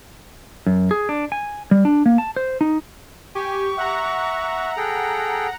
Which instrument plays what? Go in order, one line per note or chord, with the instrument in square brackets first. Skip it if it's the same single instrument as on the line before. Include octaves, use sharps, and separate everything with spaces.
[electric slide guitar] F#2
G#4
D4
G#5
G3
D4
A#3
A5
C5
D#4
[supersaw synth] G4 [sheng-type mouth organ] G#5 [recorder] C#6
[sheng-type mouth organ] E5 [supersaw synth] F#5 A#5
[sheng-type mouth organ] G#4 A4 G5